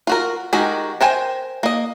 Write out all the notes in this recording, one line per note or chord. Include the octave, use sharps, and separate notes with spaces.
F4 F#4 A#4
D#3 G#3 F#4 G4 A#4
A#4 C5 G5 G#5
A#3 D#5